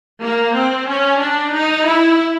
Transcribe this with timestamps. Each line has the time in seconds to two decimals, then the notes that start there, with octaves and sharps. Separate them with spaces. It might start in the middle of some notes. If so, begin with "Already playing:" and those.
0.22 A#3
0.55 C4
0.88 C#4
1.21 D4
1.53 D#4
1.86 E4